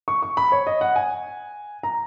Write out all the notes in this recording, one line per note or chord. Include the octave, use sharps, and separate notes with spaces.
C#6
C#6
B5
C#5
D#5
F#5
G#5
A#5